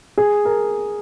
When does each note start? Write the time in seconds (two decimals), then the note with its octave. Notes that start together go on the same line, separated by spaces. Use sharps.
0.18 G#4
0.45 A#4